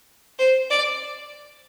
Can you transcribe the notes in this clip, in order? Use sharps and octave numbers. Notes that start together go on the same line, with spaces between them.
C5
D5